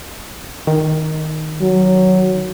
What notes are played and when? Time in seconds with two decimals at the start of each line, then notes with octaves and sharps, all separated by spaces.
0.67 D#3
1.61 F#3